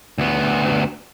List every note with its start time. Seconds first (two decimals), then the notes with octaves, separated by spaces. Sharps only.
0.18 D2 B3